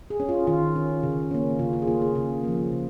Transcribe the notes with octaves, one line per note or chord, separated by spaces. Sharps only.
G#4
C#4
F4
D#3 F4
C#4
C#3
A#3 C#4
C#3 F4
F4
G#4
A#3 C#4 F4
G#4
C#3 G#4
F3 A#3
C#3